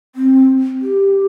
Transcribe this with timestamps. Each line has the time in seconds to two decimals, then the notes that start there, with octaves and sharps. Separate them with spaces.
0.16 C4
0.82 G4